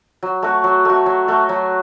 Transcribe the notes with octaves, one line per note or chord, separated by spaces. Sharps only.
F#3
A3 F#4
F#3
A3 F#4
F#3
A3 F#4
F#3